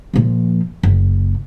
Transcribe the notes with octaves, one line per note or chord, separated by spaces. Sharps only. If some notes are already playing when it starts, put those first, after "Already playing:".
A#2 F3
F#1